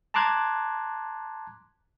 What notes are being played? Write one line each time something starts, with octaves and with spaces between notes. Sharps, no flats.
A5 A#5 C6 D6 F#6 G#6